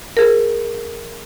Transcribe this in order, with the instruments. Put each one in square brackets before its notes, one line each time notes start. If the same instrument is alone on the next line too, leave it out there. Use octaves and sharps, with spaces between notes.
[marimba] G#4 A#4